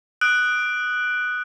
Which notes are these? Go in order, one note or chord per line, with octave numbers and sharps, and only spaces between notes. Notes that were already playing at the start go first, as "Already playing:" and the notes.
D#6 F#6 D7 F#7